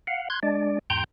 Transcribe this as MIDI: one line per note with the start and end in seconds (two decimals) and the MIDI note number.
0.07 0.28 77
0.07 0.28 78
0.30 0.40 84
0.30 0.40 90
0.30 0.40 92
0.43 0.79 56
0.43 0.79 62
0.43 0.79 74
0.90 1.04 40
0.90 1.04 44
0.90 1.04 79
0.90 1.04 82
0.90 1.04 84
0.90 1.04 91